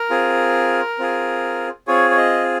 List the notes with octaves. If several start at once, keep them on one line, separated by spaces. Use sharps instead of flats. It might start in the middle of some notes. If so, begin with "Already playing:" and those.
Already playing: A#4
C4 F4 G#4
C4 F4 G#4
C4 F4 G#4 C#5
C#5
D#5